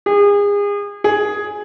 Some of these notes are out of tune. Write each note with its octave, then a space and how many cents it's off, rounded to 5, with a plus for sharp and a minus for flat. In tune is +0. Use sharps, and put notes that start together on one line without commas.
G#4 -35
G#4 +5